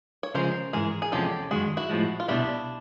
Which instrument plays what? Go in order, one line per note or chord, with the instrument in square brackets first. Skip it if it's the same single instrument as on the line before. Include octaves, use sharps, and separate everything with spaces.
[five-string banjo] C#5
[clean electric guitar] C#3 F3 G#3 [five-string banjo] A#4 C5
[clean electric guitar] G#2 E3 G#3 [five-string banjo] G#4 A#4
[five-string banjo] G#4
[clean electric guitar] E2 C3 F3 G#3 C#4 [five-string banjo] G4 A4
[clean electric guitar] F#2 D#3 G#3 [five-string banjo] F#4 G#4
[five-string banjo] E4 F#4
[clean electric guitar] A2 F3 G#3
[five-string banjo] F4
[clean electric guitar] C2 B2 G3 [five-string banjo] D4 E4